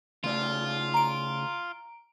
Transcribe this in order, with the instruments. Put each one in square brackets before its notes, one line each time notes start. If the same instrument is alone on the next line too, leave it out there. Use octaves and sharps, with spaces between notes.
[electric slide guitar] C#3 A3 D5 [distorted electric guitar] F4
[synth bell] A#5 D7